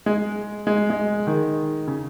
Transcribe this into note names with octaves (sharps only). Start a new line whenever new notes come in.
G#3
G#3
G#3
D#3
C#3